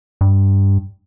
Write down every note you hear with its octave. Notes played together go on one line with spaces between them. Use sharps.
G2